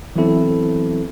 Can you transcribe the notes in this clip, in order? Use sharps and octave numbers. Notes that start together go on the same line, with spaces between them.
E3 F#3 B3 C4 E4 A4